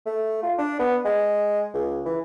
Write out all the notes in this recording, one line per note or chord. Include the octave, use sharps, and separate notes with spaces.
A3
F4
D4
B3
G#3
C#2
E3